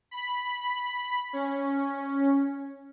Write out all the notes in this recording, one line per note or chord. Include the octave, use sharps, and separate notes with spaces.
B5
C#4